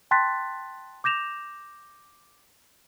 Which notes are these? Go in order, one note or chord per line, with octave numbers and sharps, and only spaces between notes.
G5 A5 C6 F#6 A6 B6
D6 G6 A#6 E7 F7